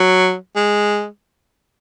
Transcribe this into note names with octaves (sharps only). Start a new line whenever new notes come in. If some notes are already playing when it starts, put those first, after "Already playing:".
Already playing: F#3
G#3